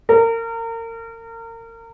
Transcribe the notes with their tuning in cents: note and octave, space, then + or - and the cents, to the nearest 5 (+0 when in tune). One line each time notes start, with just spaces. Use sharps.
A#4 -30